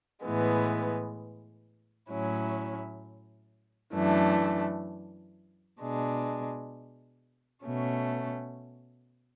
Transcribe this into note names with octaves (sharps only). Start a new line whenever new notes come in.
A2 E3 G#3 B3
A2 F#3 C#4 E4
F#2 E3 A3 D4
B2 G#3 D4
B2 A3 C#4